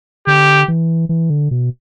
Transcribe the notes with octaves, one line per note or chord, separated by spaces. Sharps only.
D3 G4
E3
E3
D3
B2